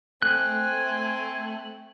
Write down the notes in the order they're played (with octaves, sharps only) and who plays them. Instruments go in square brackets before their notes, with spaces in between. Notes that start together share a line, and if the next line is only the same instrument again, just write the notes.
[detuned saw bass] A3 [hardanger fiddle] C4 [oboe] G#5 [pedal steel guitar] F#6